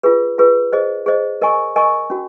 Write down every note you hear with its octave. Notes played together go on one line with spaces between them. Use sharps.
F4 G#4 B4
F4 G#4 B4
G#4 C5 D#5
G#4 C5 D#5
A#4 D#5 G#5 C#6
A#4 D#5 G#5 C#6
C#4 F#4